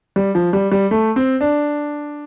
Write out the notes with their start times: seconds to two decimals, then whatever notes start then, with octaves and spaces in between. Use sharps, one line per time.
0.16 G3
0.35 F3
0.53 G3
0.72 G3
0.91 A3
1.16 C4
1.41 D4